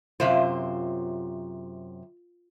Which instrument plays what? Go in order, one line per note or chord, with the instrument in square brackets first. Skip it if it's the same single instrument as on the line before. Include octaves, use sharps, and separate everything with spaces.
[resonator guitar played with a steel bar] F#2 C3 C5 [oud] F4